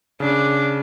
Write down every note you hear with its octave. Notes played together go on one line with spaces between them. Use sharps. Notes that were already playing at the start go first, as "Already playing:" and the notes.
C#3 D4